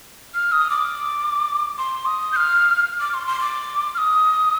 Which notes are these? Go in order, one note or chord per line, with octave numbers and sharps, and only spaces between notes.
F6
D#6
D6
C6
D#6
G6
F6
D6
C6
C6
D6
F6
D#6